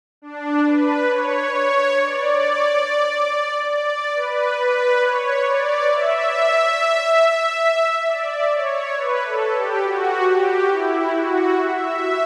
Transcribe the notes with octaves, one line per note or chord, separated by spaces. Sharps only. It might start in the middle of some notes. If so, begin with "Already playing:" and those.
D4
B4
C#5
C#5
D5
D5
B4
B4
C#5
D5
E5
D5
C#5
B4
A4
G4
F#4
G4
E4
F#4
E5